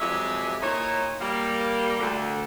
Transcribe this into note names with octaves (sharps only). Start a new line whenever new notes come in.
F2 F#3 G#3 G4 G#4 E5
A#2 D#4 E4 C#5
G3 A#3
D2 D3